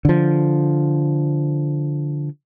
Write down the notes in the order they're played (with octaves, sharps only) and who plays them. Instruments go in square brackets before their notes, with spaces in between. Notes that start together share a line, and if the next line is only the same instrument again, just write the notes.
[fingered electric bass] D3 F3